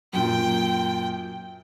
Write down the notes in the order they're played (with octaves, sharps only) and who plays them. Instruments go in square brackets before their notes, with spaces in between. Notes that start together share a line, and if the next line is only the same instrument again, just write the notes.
[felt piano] F#2 A#2 [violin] G5